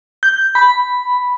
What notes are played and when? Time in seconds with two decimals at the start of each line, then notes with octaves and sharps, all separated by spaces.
0.23 G6
0.55 B5